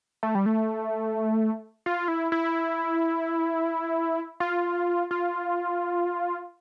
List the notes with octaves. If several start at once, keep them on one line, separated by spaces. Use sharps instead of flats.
A3
G3
A3
F4
E4
E4
F4
F4